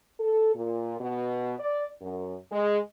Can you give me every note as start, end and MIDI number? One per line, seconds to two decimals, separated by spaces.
0.20 0.54 69
0.55 0.96 46
1.00 1.55 47
1.59 1.86 74
2.01 2.35 42
2.52 2.78 56